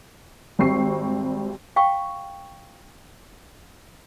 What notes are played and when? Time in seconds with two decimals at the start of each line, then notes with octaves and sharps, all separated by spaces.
0.59 G#1 G3 C4 C#6 C7
1.76 F5 G5 C#6